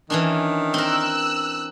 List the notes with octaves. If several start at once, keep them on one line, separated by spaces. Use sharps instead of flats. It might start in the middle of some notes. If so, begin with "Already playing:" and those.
D#3 E3 C#4 D4
C4 A#4 E6 F#6